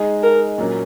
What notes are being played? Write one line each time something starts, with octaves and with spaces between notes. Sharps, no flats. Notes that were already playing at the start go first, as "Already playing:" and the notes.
Already playing: G#3 D#4 G#4
A#4
A#2 F#3 A#3 C#4